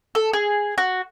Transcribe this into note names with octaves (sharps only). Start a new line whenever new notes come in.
A4
G#4
F#4